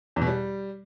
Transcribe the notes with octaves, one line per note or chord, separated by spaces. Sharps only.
E2
B2
G3